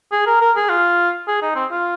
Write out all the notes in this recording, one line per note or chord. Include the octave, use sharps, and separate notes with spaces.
G#4
A#4
A#4
G#4
F4
G#4
D#4
C4
F4